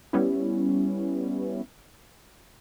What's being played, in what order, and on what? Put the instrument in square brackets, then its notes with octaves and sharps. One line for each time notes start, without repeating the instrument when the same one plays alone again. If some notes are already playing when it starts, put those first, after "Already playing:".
[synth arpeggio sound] G3 B3 C#4 E4